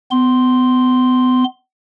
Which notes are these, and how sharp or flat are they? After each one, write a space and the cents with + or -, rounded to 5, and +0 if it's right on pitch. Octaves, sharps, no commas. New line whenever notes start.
B3 +35 C6 +0